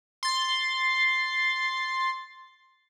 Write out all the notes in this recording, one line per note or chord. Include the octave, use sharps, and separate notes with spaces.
C6 A6